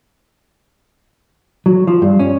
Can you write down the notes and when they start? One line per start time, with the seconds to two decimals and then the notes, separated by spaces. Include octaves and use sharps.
1.66 F#3
1.87 F3
2.02 G2
2.19 C#4